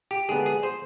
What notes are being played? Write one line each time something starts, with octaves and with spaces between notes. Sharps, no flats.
G4
D3 G#3 B3 D4 G#4
G#4
C5